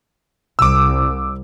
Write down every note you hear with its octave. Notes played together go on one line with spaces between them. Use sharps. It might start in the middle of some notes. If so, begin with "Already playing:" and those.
C2 D6 E6